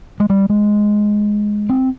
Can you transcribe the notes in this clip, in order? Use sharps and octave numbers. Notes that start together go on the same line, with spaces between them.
G#3
G3
G#3
C4